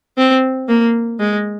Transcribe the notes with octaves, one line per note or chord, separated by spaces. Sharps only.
C4
A#3
G#3